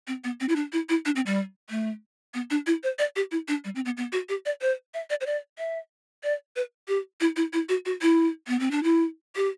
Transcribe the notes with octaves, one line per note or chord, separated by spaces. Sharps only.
C4
B3
C4
E4
D4
E4
E4
D4
C4
G3
A3
B3
D4
E4
C5
D5
G4
E4
D4
G3
C4
B3
B3
F#4
G4
D5
C5
E5
D5
C5
D5
E5
D5
B4
G4
E4
E4
E4
F#4
F#4
E4
B3
C4
D4
E4
G4